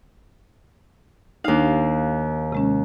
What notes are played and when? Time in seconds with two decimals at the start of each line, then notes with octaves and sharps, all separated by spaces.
1.44 D#2 D4 D#4 F5
2.52 C3 G#3 C#4